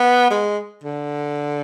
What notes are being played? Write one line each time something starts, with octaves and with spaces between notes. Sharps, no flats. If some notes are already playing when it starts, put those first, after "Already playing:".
Already playing: B3
G#3
D3